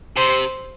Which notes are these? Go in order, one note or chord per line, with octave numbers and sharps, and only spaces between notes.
C3 C5